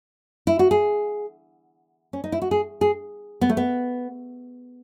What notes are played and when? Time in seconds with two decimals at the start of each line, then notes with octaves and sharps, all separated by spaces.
0.47 E4
0.59 F#4
0.71 G#4
2.13 C#4
2.24 D#4
2.32 E4
2.42 F#4
2.51 G#4
2.81 G#4
3.41 B3
3.50 A3
3.57 B3